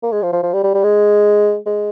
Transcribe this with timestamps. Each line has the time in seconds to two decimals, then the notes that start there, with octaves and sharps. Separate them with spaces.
0.03 A#3
0.12 G#3
0.22 F3
0.33 F3
0.43 F3
0.53 G3
0.64 G3
0.74 G3
0.84 G#3
1.66 G#3